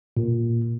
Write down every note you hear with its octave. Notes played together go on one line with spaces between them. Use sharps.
A#2